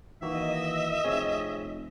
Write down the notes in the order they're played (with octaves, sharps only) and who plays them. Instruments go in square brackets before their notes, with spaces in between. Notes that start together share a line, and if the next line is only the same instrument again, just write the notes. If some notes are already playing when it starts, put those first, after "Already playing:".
[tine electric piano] D#3 A#3 F#4 [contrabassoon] E3 [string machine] D#5 [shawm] E5
[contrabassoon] F1 [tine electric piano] C4 G#4 C#5